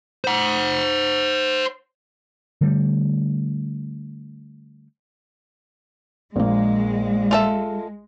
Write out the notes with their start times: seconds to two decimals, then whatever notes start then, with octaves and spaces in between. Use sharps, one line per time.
0.25 C5 F#5
2.61 D3 G3 A3
6.36 A#1 G#3 A#3
7.31 F4 A4 E5